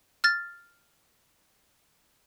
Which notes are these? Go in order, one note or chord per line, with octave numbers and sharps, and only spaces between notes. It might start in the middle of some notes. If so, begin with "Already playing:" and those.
F6 A6